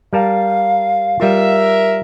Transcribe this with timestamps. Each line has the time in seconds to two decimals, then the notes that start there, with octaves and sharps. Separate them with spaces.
0.13 G3 A#4 F5 A5
1.20 G3 F4 A#4 E5